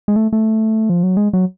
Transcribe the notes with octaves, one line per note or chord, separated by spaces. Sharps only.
G#3
A3
A3
F3
F#3
G#3
F#3